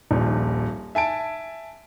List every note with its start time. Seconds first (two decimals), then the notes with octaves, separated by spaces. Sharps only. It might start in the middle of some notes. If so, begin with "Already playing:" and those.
0.11 D#1 A#1
0.95 E5 G#5 A5 D7